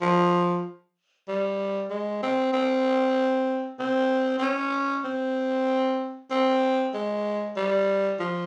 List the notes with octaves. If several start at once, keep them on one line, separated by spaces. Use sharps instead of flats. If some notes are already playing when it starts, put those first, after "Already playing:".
F3
G3
G#3
C4
C4
C4
C4
C#4
C4
C4
G#3
G3
F3